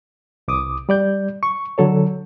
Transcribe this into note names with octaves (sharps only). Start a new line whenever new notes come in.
C2 D6 D#6
G3 D5 G6
C#6
D3 F#3 A4 C#5